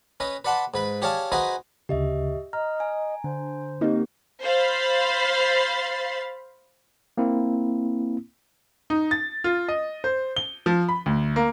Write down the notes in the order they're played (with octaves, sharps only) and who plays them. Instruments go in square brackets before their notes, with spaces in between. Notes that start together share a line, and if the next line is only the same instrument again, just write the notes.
[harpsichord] C#4 B4 D#5
B4 D5 F#5 A5 B5 C6
G#2 B4 B5
G4 G#4 C#5 D5 F5 A5
D#4 F#4 G#4 B4 C5 D#5
[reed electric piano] D2 C#3 [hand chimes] G4 D#5 E5
[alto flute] D#5 [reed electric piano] A#5 [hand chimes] F6
[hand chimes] G#5
[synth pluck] D3 [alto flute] C5
[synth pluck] A#3 D#4 [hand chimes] C4 G4
[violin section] C5 F5 B5 A6 C7
[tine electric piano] A#3 C4 E4
[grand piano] D#4
A6
F4
D#5
C5
G7
F3
B5
D2
A#3